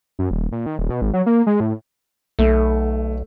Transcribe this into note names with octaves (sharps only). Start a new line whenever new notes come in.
F#2
D#1
A#2
D#3
D#1
B2
G#1
F#3
A#3
G#3
A2
B1 A3